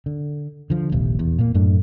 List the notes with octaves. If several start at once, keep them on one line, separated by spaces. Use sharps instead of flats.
D3
D3 F3
D#1 A#1 C3
E2
A#2 A#3
F#2 A2 A3 D4